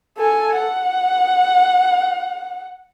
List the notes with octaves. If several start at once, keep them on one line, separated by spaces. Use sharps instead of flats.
A4 G#5
F#5